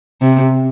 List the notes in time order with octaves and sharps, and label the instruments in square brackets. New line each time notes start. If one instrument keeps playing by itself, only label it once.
[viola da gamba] C3